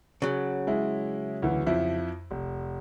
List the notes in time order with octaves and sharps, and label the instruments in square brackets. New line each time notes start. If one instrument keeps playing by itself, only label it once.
[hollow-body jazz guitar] C#3 F#3
[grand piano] G#3 E4
D2 E3
F2 F3 E4
F1